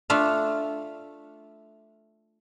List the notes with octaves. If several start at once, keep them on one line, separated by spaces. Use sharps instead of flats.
A3 D4 F4 E5 F5